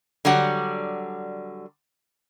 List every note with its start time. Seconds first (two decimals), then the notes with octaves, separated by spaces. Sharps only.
0.25 D3 F#3 G3 F#5